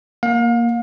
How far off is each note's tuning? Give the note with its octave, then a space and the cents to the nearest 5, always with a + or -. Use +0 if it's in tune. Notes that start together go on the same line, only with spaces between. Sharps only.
A#3 +0 F5 +35